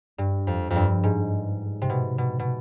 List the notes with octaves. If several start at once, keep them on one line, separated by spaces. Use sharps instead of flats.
G2
F2
F2
G2
G#2
C3
B2
B2
B2